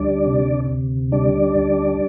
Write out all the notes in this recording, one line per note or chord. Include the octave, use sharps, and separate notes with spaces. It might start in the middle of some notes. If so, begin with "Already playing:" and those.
Already playing: D2 G3 D4 D5
C3
D2
G3 D4 D5
D2